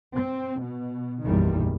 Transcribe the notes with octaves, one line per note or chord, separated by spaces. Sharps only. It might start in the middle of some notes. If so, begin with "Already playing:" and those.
C4
B2
F#1 B1 E2 D#3 G3